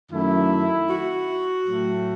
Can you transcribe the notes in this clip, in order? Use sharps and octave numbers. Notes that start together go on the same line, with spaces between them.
F#2 D#3 A3 E4
F#4
A2 F#3 A3